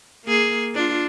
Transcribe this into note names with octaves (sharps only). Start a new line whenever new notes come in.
A#3 G#4
D4 F4